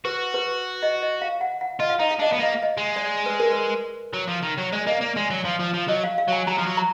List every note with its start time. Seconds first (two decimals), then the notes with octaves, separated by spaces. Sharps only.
0.05 F#4 B4
0.34 B4
0.83 D#5
1.02 D#5
1.22 F5
1.41 F#5
1.61 F#5
1.80 F4 D#5
1.90 F5
1.99 D#4 D#5
2.11 F5
2.19 D4 D#5
2.31 B3 F5
2.39 A#3 D#5
2.52 F5
2.63 D#5
2.77 G#3
2.96 D5
3.26 B4
3.40 A#4
3.52 B4
4.13 F#3
4.28 F3
4.42 D#3
4.57 F#3
4.72 G#3 D5
4.87 A#3 D#5
5.01 A#3 D5
5.16 G#3 D5
5.30 F#3
5.45 F3
5.60 F3
5.74 F3
5.88 F#3 D#5
6.04 F5
6.18 F5
6.28 F#3 G#5
6.47 F#3 A#5
6.58 F3
6.66 F#3
6.77 A#5